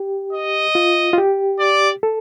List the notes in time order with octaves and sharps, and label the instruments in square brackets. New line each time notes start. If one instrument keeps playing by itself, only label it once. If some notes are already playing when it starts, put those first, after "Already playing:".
Already playing: [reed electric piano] G4
[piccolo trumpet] D#5
[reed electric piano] F4
F4
G4
[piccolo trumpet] D5
[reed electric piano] A4